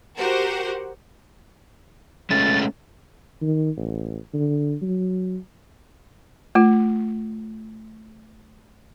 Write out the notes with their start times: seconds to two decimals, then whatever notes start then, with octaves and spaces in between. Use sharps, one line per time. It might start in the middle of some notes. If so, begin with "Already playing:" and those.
0.17 F#4 G4 A#4 C5 F#5
2.30 G#3 A3 C#4 A6
3.42 D#3
3.77 A1
4.34 D3
4.82 F#3
6.55 A3 F4